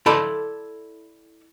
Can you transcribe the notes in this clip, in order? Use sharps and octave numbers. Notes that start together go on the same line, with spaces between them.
E4 A4 D5 A5 B5 C6